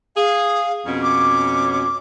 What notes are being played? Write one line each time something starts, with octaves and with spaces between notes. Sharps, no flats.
G#4 F5
F2 B2 C#4
D6